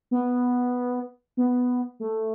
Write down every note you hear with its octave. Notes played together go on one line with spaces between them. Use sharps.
B3
B3
A3